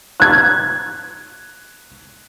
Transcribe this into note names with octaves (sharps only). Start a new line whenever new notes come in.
F#6 G#6